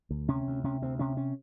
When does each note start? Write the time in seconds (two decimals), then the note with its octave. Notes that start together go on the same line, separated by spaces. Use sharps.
0.10 D2
0.28 C3 C#4
0.47 D2
0.64 C3 C#4
0.82 D2 C4
0.99 C3 C#4
1.17 C#4